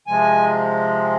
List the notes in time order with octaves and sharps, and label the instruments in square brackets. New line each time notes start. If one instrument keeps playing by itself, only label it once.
[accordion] C3 F3 G#3 G#5